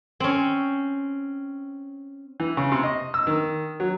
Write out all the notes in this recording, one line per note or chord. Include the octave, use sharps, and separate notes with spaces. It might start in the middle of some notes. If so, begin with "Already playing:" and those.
C4 C#4
E3
C#3
C3
D#5
E6
D#3
F#3